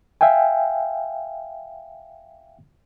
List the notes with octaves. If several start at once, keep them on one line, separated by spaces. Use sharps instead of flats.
E5 F5 G5 G#5